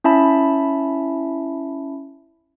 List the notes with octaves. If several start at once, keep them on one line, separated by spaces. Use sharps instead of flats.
C#4 E4 E5 A5 B5